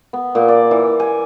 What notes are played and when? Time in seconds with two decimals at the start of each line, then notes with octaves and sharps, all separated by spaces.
0.13 B3
0.35 A#2
0.48 D5
0.71 E3
1.00 G#5